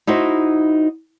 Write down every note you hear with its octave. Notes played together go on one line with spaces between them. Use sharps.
D#4 E4 F#4 C5